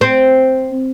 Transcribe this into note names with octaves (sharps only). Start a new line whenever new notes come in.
C4